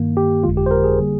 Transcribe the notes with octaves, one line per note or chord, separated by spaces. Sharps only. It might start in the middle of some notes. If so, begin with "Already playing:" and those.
Already playing: G2 D#3 A#3
G4
G1 F2 D3 G#3 F4
G4
C5
A#4
G#4
D3 G3 A#3